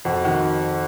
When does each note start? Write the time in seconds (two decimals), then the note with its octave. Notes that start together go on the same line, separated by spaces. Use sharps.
0.05 F2 F#4
0.24 D#3 F#4